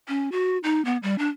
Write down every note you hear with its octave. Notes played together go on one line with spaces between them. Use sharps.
C#4
F#4
D#4
B3
G3
D4